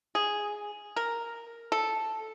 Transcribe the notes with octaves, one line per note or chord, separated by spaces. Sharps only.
G#4
A#4
A4